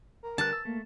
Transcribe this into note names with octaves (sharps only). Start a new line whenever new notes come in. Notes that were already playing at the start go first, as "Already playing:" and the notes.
A#4
D3 G3 A5 F#6
E6
A3 A#3